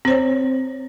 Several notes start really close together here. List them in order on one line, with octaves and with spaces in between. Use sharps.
C4 C5 C#5